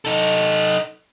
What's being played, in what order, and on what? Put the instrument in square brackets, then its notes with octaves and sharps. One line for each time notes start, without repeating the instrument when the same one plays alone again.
[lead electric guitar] D#4 A4